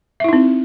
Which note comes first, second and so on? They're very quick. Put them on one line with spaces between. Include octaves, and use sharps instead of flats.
E5 E4 D#4 C4